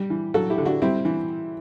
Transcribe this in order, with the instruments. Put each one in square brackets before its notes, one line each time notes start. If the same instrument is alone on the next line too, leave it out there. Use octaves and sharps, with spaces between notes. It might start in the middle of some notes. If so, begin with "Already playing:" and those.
Already playing: [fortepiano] G3
E3
F#3 F#4 A4
E4 G4
D3
D4 F#4
G3 C4 E4
E3